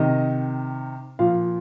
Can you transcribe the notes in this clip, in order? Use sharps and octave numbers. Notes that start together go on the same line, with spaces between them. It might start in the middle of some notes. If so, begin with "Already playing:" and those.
Already playing: C3 D#3 D#5
A#2 F3 F5